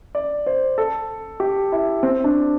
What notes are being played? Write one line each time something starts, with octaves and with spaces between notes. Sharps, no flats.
D5
C5
A4
G4
E4
C4
D4